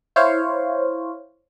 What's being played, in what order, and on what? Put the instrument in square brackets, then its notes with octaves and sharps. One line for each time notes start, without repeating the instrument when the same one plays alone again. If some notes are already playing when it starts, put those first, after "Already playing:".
[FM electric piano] E4 C5 C#5 F5